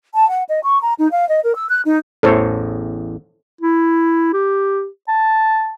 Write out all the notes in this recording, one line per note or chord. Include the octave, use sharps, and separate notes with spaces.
A5
F#5
D#5
C#6
A#5
D#4
F5
D#5
A#4
E6
F#6
D#4
A1 E2 A2 A4 C5 C#5
E4
G4
A5